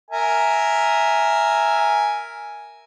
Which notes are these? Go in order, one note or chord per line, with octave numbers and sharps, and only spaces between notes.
A#4 E5 G#5